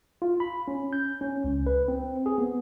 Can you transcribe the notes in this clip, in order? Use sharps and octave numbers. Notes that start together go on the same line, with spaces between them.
F4
B5
C#4
G6
C#4
C#2
B4
C4
G#4
B3